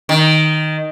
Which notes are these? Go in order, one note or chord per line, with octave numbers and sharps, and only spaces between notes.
D#3